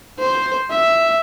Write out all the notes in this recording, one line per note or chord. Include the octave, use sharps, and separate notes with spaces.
C5
E5